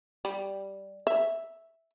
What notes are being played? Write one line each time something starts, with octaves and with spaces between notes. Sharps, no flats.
G3
E5